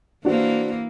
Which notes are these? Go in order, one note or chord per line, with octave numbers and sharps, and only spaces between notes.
E3 A#3 D4 F#4 C5